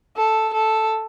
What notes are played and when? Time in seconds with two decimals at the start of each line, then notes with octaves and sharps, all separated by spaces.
0.16 A4
0.53 A4